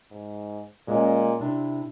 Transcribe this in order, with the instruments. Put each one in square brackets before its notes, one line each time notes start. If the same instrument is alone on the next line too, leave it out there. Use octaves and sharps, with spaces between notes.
[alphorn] G#2
[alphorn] A#2 [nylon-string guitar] G#3 C#4
[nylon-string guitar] C3 D4 [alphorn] E4